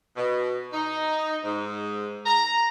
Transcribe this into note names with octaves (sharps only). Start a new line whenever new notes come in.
B2
D#4
G#2
A#5